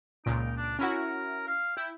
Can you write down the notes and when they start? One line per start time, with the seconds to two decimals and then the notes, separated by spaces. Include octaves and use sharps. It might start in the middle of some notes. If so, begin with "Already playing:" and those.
0.25 C#2 A#2 D#4 D7
0.57 D4
0.79 C#4 E4 F#4 A#4
1.47 F5
1.77 E4 G5